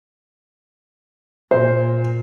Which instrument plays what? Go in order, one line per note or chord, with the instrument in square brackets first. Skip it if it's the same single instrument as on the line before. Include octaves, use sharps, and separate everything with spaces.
[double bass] A#2 [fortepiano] C5